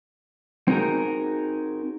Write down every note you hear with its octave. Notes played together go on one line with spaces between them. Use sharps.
C4 D#4 F#4 G#4 A#4